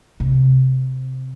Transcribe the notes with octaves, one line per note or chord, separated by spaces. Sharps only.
C3